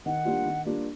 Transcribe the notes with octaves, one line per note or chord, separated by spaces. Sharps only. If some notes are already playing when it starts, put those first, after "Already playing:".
D#3 F#5
G3 A#3 D4 F4
D#3
G3 A#3 D4 F4